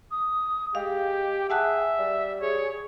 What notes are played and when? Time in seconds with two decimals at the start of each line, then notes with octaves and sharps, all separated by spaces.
0.11 D#6
0.75 G#3 G4 F5 G5
1.50 G#4 E5 F#5 A5 F#6
1.99 G3
2.41 G#4 C#5